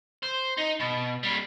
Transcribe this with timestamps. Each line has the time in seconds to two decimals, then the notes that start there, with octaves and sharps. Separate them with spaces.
0.23 C5
0.57 D#4
0.80 B2
1.23 G3 A#3